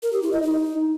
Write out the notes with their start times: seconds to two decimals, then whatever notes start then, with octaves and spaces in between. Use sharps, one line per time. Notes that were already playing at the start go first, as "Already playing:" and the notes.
0.03 A#4
0.13 G4
0.22 E4
0.32 D#5
0.42 D#4